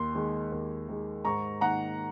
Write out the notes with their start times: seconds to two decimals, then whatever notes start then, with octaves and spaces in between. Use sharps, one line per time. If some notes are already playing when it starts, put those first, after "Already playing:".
Already playing: D#2 C6
0.15 D#3 G#3
0.52 D#2
0.88 D#3 G#3
1.24 G#2 A#5 C#6
1.61 D#3 A#3 D#4 F#5 A#5